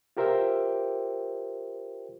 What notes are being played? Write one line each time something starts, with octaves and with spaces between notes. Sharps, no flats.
F4 G4 A#4 C5 E5 G5